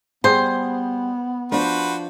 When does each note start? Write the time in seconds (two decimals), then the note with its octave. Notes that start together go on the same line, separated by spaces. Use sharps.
0.24 G3 B3 G#4 C5
1.52 F3 D4 F#4 B4 C5